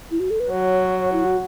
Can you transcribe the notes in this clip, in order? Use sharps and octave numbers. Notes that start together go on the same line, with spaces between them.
E4
F#4
A4
B4
F#3 C#5
E4
F#4